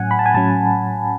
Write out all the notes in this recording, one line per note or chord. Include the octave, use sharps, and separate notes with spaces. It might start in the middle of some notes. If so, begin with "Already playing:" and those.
Already playing: A2 F#3 C#4 F#5 G#5
B5
A5
G#5
A2 F#3 C#4 A5